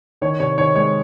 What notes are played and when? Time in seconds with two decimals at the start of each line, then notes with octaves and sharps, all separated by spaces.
0.21 D#3 C#5
0.40 C3 C#5
0.58 D#3 C#5
0.76 G#3 C#5